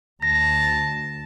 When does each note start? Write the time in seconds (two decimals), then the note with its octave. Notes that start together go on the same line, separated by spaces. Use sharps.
0.22 D2 A5 A#6